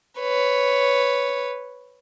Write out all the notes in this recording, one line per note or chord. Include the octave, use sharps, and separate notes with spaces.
B4 C#5